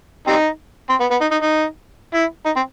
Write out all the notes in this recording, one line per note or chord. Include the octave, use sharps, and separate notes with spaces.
G3 C4 D#4
C4
B3
B3
D#4
D#4
D#4
E4
D#4
C4